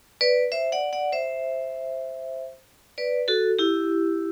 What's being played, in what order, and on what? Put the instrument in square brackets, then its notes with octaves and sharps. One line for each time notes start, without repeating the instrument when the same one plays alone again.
[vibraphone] B4 D5
C5 E5
D5 F#5
D5 F#5
C5 E5
B4 D5
F#4 A4
E4 G4